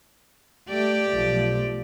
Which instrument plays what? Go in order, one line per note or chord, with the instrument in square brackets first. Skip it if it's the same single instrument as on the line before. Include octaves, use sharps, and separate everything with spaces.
[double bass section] A3 [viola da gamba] G4 D5
[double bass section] B1 F3 A3